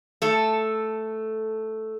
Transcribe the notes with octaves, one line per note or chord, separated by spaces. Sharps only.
A3 A4